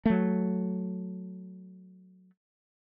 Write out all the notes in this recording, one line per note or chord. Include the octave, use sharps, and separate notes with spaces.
F#3 A3